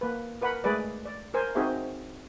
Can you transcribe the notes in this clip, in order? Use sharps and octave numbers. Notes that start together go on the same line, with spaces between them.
A#3 B4
A#4 B4 F#5 B5
G#3 A3 G#4 B4 D5
D5
A#4 C5 G#5
C4 D#4 F#4 G#4 C5 E5